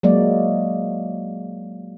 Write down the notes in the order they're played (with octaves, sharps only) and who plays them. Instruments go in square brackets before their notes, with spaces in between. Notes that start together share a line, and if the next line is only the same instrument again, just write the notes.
[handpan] F#3 G#3 A#3 D5